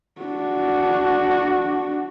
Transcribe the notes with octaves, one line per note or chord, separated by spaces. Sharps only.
D4 F#4